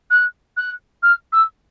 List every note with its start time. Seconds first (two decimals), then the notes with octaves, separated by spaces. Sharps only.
0.11 F#6
0.57 F#6
1.03 F6
1.33 E6